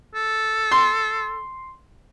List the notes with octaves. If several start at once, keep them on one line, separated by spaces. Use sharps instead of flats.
A4
C6